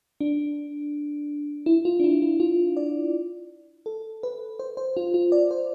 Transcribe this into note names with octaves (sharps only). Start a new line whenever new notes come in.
D4
E4
F4
D4
E4
E4
F4
D5
A4
B4
C5
C5
F4
F4
D5
C5